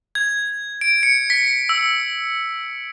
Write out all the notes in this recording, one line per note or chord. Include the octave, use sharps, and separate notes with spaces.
G#6
D7
C#7
B6
E6